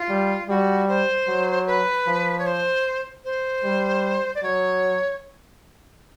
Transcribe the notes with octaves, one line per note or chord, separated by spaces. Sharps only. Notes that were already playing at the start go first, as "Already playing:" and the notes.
Already playing: F4
G3
G3 F#4
C5
F#3
B4
F3
C#5
C5
C5
G3
D5
F#3 C#5